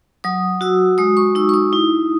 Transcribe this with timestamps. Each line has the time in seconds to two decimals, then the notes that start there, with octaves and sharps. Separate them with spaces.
0.24 F#3 D#6
0.61 F#4 E6
0.98 G#3 D#6
1.17 C#6
1.35 D#4 E6
1.49 C#6
1.54 D#6
1.73 E4